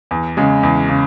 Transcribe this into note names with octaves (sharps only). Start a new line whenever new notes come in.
E2
C#3 G#3
E2
C#3